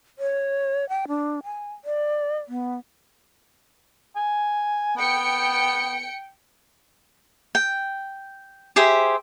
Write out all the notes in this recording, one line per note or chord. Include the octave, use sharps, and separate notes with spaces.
C#5
G5
D4
G#5
D5
B3
G#5
B3 G5 C#7
G5
G4 G#4 C5 E5